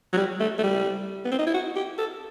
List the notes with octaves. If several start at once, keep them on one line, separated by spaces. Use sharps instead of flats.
F#3
G3
A3
A3
G3
B3
C4
D#4
E4
F#4
G4
A4